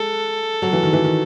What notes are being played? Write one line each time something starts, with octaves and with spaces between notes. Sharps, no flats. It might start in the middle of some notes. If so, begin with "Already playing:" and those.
Already playing: G#3 A4
F#3
E3
D#3
E3
D#3